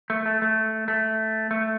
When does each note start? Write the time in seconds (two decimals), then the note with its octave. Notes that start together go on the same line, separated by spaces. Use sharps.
0.10 A3
0.26 A3
0.42 A3
0.88 A3
1.51 A3